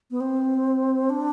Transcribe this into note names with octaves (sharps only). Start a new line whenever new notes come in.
B3
C4
D4